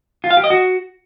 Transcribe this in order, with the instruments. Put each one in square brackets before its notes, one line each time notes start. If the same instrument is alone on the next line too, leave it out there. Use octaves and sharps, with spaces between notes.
[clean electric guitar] F4
F5
G4
D#5
F#4